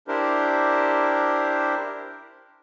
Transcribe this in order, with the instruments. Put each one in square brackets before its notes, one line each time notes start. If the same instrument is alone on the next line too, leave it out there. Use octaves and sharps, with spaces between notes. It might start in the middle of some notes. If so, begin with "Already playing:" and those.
[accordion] D4 E4 G4 A#4 C5